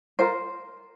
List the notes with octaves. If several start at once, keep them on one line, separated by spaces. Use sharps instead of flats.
F4 A#4 C5